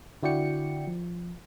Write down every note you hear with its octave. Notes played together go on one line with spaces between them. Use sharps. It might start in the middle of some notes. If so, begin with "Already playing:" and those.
D3 E4 F#4 D5 G5 C#7
F3